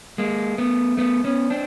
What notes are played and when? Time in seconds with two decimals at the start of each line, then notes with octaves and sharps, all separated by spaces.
0.18 G#3 A#3
0.58 A3 B3
0.97 A3 B3
1.24 B3 C#4
1.50 C4 D4